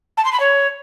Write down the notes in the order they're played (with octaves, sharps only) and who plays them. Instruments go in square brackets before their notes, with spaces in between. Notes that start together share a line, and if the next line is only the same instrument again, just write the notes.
[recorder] A5
C6
B5
C#5